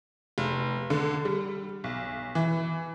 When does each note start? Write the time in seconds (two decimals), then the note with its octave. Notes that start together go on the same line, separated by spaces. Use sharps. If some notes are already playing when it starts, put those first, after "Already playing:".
0.38 F1
0.90 D3
1.25 G3
1.84 B1
2.35 E3